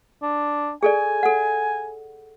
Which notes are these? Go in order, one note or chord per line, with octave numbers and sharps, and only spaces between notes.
D4
G#4 A4 D5 G#5
A4 F#5